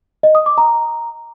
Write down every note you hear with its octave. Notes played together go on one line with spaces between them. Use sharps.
D#5
D#6
D6
A#5